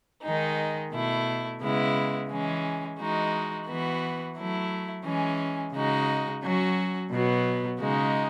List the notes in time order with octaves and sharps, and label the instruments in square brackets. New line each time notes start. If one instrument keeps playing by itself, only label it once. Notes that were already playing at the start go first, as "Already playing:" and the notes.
[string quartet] D#3 G#3 D#4
B2 A3 E4
C#3 G#3 B3 E4
E3 G#3 C#4
E3 G#3 D#4 F#4
E3 B3 F#4
F#3 A3 E4
E3 G#3 C#4
C#3 G#3 D#4 F#4
F#3 C#4 F#4
B2 F#3 B3
C#3 G#3 D#4 F#4